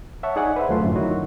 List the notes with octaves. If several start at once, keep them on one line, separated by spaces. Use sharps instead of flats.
C#5 E5 F#5 A5 C#6
D#4 G#4 D5 F#5 G#5
B4 C5 E5 F#5
D#2 F#3 A3 F4 C6
F#2 A2 D3
D#3 F#3 E4 F#4